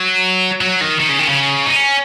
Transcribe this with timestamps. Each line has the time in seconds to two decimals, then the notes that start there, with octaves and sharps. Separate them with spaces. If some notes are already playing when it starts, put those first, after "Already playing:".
Already playing: F#3
0.61 F#3
0.81 D#3
1.00 D#3
1.09 C#3
1.19 D#3
1.28 C#3
1.66 D#4
1.76 C#4